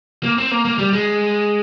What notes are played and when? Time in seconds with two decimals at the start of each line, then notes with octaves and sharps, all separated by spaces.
0.23 A#3
0.38 C4
0.51 A#3
0.65 A#3
0.79 G3
0.93 G#3